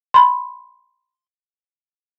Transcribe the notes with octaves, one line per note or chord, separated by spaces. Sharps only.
B5 C6